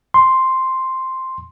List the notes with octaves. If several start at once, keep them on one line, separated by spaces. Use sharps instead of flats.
C6